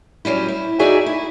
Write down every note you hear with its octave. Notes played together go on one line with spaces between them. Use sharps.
F#3 G3 C#4 E4
E4
D#4 F#4 G#4 D5 E5 G#5
E4